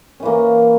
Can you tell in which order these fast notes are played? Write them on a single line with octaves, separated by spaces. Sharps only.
C#4 E3 A#3